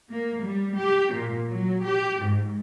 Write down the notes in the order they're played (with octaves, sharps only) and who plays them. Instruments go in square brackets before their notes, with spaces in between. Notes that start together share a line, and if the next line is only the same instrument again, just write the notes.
[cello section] A#3
G3
G4
A#2
F#3
G4
G#2